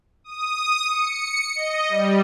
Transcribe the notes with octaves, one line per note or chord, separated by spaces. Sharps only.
D#6
C#7
D#5
G3